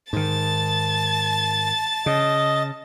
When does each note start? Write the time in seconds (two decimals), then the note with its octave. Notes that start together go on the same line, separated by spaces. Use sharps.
0.13 G#2 D#3 A5 A6
2.06 C#3 D#5